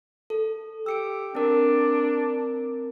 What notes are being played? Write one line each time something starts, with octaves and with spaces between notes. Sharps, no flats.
A4
G4 E6 C#7 D7
C4 D4 A#4